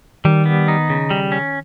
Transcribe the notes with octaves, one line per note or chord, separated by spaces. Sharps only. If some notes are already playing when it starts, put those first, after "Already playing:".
D#3 G3
B3
D#4
C#3
G3
C#4